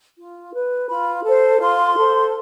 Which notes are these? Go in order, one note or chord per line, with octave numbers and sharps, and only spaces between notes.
F4
B4
F4 B5
A4 C5
F4 C6
A4 C5